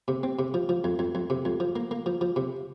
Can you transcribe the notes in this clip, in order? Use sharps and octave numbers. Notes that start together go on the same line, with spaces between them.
C3
C4
C3
F3
F3
F2
F2
F2
C3
F2
F3
A#3
A#3
F3
F3
C3